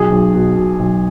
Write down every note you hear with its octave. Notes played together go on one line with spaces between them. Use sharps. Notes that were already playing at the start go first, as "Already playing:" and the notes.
Already playing: B1 G#4
B1
B2
B2
B1